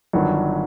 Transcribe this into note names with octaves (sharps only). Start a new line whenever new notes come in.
G1 G2 D#3 F#3